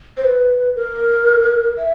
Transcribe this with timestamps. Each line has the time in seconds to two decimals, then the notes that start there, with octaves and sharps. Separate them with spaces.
0.17 C5
0.24 B4
0.76 A#4
1.78 E5